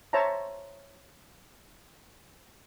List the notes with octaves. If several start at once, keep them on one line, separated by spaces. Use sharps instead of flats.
C5 C#5 E5 A5 A#5